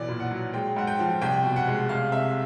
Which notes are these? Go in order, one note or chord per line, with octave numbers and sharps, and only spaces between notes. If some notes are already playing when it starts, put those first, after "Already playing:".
Already playing: B1 E3 D5
A#2
F#5
F#3
G#3 G5
G#2 F#5
G5
F3
C2 G5
B2
F#5
G#3
C2 F5
C3 E5